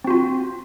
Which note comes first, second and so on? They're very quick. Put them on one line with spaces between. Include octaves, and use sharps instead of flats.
C4 F#4 F4